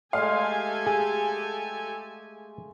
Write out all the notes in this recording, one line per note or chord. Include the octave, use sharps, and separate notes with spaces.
G#3 A3 G4 A4 F5 G#5
G#4